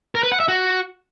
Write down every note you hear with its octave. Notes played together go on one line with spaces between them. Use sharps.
A#4
B4
F#5
E5
F#4